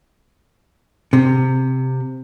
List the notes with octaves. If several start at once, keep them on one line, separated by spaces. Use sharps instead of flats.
C3